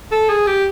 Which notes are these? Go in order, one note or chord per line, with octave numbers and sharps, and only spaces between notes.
A4
G#4
G4